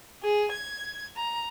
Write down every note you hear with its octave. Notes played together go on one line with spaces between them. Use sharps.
G#4
G#6
A#5